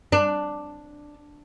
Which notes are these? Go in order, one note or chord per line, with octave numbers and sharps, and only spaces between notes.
D4